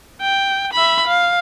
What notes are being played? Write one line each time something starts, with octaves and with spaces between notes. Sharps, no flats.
G5
E5 B5
F5